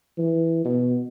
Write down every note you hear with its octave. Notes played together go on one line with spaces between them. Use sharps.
E3
B2